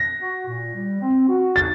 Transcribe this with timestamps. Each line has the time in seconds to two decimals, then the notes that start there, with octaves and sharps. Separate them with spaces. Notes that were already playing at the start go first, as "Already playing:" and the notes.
Already playing: A#6
0.20 F#4
0.47 A#2
0.74 G3
1.01 C4
1.28 F#4
1.56 D#4 A6